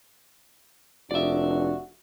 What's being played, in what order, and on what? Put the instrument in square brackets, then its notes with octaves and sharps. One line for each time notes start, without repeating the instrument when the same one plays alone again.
[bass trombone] F1 [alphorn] D4 [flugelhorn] F#4 [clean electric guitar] D5 E5